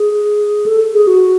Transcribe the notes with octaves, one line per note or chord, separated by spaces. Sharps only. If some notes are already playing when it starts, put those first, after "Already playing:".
Already playing: G#4
A4
G#4
F#4